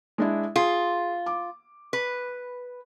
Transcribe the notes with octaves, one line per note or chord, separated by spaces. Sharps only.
G#3 D4 E4
F4 G#4
D6
B4